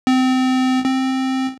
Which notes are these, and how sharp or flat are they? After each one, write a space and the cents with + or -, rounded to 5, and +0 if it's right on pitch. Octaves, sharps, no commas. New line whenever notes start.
C4 -25
C4 +5